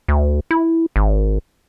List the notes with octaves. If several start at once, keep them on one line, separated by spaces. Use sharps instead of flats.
D2
E4
G#1